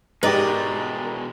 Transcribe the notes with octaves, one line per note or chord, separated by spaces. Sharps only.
G#2 B2 G#3 G4 A#4 B4 D5 D#5